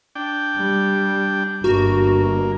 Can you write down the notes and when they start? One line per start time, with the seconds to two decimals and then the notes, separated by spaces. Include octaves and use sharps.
0.15 D4 G5
0.57 G3
1.64 G1 G2 A#3 F#4